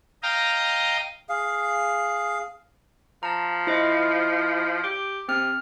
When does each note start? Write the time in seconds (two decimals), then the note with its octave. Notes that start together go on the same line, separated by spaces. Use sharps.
0.23 D#5 F5 G5 A#5 D#6
1.29 G#4 F5
3.23 F3 A5 A#5
3.67 E4 C5 D#5
4.83 G4
5.29 C3 C4 F6